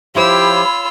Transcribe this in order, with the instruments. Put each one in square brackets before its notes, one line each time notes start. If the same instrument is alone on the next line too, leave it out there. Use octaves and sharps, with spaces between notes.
[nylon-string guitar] F3 E4 C5 [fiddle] F4 E6 [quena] G4 [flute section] C#5 B5